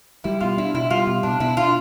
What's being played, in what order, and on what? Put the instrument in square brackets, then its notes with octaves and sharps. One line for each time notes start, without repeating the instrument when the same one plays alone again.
[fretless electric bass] G3 [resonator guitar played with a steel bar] E4
[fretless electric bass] B2 [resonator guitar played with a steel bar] F4
[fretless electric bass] D4 [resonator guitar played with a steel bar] E4
[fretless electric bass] B2 [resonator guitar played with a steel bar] E4
[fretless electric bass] G3 [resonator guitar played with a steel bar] F4
[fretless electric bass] B2
[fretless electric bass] B2 [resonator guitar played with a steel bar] D4
[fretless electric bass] B2 [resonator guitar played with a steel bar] E4
[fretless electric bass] D4 [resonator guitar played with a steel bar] F4